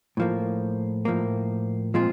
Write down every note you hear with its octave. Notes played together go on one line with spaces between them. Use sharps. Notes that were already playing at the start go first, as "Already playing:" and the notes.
A2 F3 A#3
A2 F3 A#3
A#2 F3 G#3 C4 F4